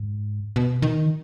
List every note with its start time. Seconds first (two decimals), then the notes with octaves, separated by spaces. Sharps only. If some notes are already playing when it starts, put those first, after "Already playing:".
Already playing: G#2
0.56 B2
0.82 D#3